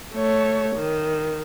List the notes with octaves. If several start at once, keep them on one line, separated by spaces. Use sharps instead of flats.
A3 C#5
D#3